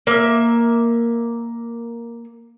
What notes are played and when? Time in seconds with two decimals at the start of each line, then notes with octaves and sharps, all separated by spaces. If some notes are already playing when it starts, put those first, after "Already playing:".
0.07 A#3 E5